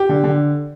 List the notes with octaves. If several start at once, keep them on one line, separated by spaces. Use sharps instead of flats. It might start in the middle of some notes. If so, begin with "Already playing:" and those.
Already playing: G4
D3
D3